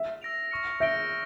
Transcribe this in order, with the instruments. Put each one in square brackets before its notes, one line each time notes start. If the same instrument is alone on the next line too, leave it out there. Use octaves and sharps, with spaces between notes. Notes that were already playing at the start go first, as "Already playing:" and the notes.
Already playing: [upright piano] E5
[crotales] E6 A#6 D7 F7
C#6 F6 C#7
[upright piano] E5 [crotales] G6 A#6 D7 G7